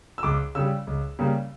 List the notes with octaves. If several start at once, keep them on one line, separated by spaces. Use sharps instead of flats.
E6
C#2 D6
C#3 G3 E6
C#2
C#3 G3 A#3